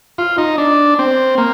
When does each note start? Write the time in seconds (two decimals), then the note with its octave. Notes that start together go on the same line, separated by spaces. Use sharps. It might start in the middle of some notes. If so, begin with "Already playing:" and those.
0.18 F4
0.38 D#4
0.58 D4
0.99 C4
1.38 A#3